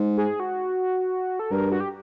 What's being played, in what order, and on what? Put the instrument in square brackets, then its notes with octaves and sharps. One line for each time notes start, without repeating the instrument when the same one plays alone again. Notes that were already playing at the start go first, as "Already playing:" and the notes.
Already playing: [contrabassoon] G#2
[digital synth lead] G#4
F#4
A4
[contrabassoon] G2 [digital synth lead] A#4
[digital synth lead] F#4
G4